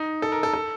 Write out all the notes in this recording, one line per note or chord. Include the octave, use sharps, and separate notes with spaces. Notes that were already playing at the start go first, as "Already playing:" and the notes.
Already playing: D#4
A4
A#4
A4
A4